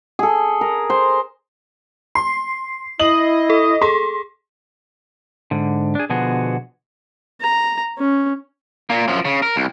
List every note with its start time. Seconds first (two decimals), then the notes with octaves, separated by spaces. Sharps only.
0.19 G#4 A4
0.61 A#4
0.90 C5
2.15 C6 C7
3.00 E4 D#5 F#7
3.50 A4
3.81 G#4 A4 C6
5.51 G#2 D3
5.95 D4 G#4
6.10 B2 D3 F3 B3 F#4 G#4
7.41 A#5
7.98 C#4
8.90 A#2 A#3
9.08 F#2 F3
9.25 C#3
9.42 A#4
9.56 C2